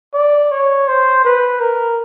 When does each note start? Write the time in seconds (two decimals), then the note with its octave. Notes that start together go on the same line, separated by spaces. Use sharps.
0.14 D5
0.51 C#5
0.88 C5
1.25 B4
1.60 A#4